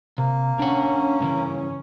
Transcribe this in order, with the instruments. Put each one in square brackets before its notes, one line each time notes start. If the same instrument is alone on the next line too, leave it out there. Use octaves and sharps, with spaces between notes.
[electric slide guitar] C3 [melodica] A#3
[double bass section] C#4 [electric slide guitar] D4 F#5
[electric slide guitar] G2 C#3 E3